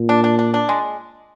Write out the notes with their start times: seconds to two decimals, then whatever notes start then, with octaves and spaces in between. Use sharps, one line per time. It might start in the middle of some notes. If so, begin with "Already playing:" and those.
Already playing: A#2
0.09 D4
0.24 D4
0.39 D4
0.54 D4
0.69 G#3